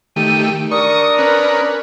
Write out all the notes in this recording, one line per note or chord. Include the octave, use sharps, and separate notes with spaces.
D#3 A3 G4 D#7
D4 A#4 C#6 D#6
C#4 B4 F#6